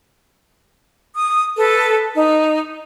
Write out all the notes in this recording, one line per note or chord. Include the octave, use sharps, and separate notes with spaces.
D#6
A4 B4
D#4